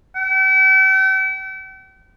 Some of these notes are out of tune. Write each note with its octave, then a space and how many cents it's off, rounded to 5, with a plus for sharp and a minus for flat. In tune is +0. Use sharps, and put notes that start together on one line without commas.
G5 -45